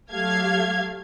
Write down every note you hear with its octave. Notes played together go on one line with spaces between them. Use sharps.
F#3 A3 G4 A4 F5 G#6